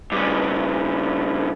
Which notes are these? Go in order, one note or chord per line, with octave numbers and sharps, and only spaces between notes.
G2 C#3